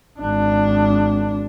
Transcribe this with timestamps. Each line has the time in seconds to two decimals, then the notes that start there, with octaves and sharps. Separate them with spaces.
0.20 G#1 D4